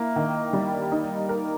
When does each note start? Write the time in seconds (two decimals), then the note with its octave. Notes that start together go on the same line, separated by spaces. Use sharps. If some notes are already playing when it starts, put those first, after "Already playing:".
Already playing: A#3 E4
0.16 D#3
0.53 G3
0.92 D#4
1.29 A#4